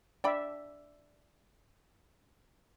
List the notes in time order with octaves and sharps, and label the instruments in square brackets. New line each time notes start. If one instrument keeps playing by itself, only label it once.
[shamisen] D4 G5 B5 [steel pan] D5 E5